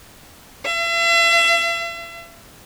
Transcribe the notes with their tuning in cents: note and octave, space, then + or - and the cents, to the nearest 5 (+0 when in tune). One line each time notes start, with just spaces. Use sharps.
E5 +40